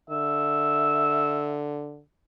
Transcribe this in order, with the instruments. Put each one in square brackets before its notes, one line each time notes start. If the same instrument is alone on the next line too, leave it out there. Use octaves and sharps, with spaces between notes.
[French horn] D3 [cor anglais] E5